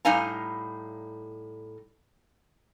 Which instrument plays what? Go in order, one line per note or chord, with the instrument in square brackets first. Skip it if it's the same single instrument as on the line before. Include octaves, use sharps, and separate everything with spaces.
[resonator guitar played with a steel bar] A2 G3 D#4 F5 G#5 A#5